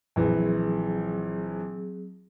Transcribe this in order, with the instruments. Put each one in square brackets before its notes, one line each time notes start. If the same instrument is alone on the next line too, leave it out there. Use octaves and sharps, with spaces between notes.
[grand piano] A#1 E3 [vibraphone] F#3 C4 G#4